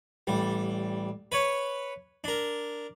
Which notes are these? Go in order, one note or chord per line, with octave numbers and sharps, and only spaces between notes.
A1 G3
B4 C#5
D4 A#4